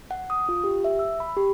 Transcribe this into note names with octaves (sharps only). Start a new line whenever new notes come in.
F#5
D#6
F4
G4
E5
E6
B5
G4